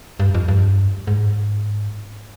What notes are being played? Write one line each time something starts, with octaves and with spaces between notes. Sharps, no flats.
G2
F2
G2
G#2